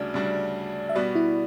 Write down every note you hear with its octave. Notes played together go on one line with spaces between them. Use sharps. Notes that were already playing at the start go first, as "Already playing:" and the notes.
Already playing: D2 C#3 G3 D4 F#4 D5
D2 C#3 G3 D4 F#4
E5
B2 G3 B3 F#4 D5
E4